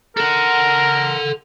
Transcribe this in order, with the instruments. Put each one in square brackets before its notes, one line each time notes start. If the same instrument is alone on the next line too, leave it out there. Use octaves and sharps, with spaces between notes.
[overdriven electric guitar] A4 F#5 [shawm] A#4